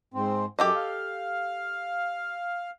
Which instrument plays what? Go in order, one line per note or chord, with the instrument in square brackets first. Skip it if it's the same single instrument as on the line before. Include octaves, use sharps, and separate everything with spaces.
[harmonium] G#2 C4
[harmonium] F#2 [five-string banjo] G4 A4 D#5
[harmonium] F5